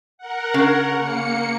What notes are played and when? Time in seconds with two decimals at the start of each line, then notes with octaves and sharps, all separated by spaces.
0.18 A#4 F#5
0.54 C#3
0.98 A#3 C#7